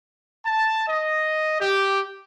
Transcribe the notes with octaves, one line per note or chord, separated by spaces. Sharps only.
A5
D#5
G4